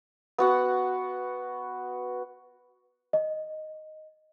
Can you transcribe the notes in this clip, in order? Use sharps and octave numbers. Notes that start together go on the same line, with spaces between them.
B3 F#4 F#5
D#5